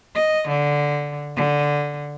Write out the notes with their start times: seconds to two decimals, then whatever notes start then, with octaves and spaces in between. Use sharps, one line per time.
0.15 D#5
0.48 D3
1.36 D3